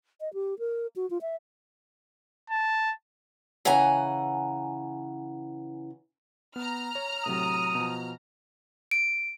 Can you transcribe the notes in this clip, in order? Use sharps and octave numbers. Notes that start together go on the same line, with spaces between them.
D#5
G4
A#4
F#4
F4
E5
A5
C#3 E3 F#5 G#5 A#5
B3 A#5 F6
C#5
A2 C3 F#3 D#6
B2 F3
D7